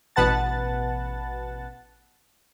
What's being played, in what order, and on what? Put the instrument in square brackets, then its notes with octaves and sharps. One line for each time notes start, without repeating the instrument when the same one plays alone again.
[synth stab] A1 B2 B4 F#5 A5 A6